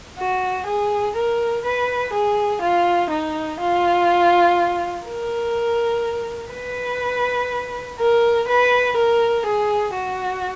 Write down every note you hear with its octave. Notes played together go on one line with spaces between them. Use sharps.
F#4
G#4
A#4
B4
G#4
F4
D#4
F4
A#4
B4
A#4
B4
A#4
G#4
F#4